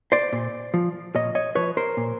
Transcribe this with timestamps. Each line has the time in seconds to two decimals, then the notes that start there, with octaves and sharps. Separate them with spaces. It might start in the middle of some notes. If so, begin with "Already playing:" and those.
0.12 C5 D5
0.32 A#2
0.74 F3
1.15 A#2 C#5 D#5
1.35 C#5 D#5
1.55 F3 B4 C#5
1.77 A#4 C5
1.97 A#2